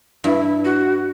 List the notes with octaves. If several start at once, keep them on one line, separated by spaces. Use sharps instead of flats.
G2 E4
F#4